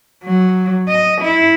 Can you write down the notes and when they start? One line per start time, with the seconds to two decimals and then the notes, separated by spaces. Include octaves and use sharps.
0.24 F#3
0.89 D#5
1.22 E4